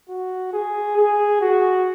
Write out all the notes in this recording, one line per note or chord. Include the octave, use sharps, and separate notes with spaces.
F#4
G#4
G#4
F#4